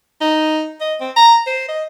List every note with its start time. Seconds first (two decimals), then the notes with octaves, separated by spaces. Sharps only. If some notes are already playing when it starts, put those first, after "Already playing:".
0.21 D#4
0.81 D#5
1.01 C4
1.16 A#5
1.47 C5
1.69 D#5